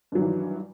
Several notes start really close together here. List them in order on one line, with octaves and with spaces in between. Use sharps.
G2 F#3 D#3 E3